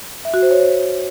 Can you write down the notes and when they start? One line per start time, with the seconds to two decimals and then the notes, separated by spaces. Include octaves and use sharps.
0.25 E5
0.34 F#4
0.42 C5
0.51 C#5
0.60 C5